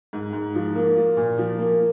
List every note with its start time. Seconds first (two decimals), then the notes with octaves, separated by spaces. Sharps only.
0.13 G#2
0.33 G#2
0.55 F3
0.75 A#3
0.96 F4
1.17 A#2
1.38 F3
1.58 A#3